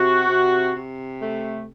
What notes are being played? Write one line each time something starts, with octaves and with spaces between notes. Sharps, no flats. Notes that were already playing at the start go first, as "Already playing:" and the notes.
Already playing: C3 F#4
C3
C3
A3